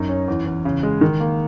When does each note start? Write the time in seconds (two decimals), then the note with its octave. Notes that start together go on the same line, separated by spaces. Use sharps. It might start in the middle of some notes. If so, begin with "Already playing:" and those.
Already playing: F#2 D#4
0.09 C#4
0.28 E2
0.46 E2
0.65 C#3
0.83 G#3
1.01 D#3
1.20 A#3